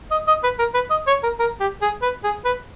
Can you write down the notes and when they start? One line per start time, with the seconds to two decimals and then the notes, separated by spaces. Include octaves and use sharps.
0.11 D#5
0.28 D#5
0.43 B4
0.59 A#4
0.74 B4
0.90 D#5
1.07 C#5
1.23 A#4
1.39 A#4
1.60 G4
1.81 G#4
2.02 B4
2.24 G#4
2.45 B4